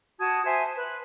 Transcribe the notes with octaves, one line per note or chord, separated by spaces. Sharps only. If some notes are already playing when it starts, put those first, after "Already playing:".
F#4 A5 D#6 G#6
C5 E5 G#5 A5
B4